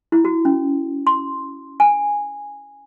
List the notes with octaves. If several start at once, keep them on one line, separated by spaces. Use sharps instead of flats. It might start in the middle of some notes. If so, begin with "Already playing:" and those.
E4
F#4
C#4
C6
G#5